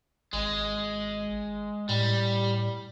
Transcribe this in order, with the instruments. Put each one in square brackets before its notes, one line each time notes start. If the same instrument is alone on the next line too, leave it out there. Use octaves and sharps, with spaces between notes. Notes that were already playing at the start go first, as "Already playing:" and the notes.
[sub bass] G#1 [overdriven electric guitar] G#3
[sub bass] A2 [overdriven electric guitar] G3